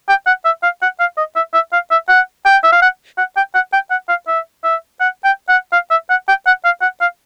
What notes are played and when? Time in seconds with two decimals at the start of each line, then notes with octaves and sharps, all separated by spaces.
0.09 G5
0.26 F#5
0.45 E5
0.63 F5
0.82 F#5
1.00 F5
1.17 D#5
1.36 E5
1.54 E5
1.73 F5
1.91 E5
2.09 F#5
2.46 G5
2.64 E5
2.72 F5
2.82 F#5
3.18 F#5
3.36 G5
3.55 F#5
3.73 G5
3.90 F#5
4.09 F5
4.28 E5
4.64 E5
5.00 F#5
5.24 G5
5.49 F#5
5.73 F5
5.91 E5
6.10 F#5
6.28 G5
6.46 F#5
6.65 F5
6.82 F#5
7.01 F5